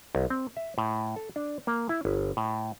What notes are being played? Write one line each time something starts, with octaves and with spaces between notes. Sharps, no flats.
C2
C4
E5
A2
A4
D4
A#3
E4
G1
A2